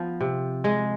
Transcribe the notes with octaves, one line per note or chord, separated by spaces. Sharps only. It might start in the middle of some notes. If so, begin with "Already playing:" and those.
Already playing: F3 B3
C3
G#3